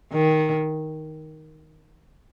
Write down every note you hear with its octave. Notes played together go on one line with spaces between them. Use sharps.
D#3